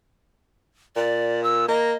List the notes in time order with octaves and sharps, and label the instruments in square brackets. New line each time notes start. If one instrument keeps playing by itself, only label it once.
[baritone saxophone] A#2 [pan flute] D5
[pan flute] E6
[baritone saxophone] A#3 [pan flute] D#5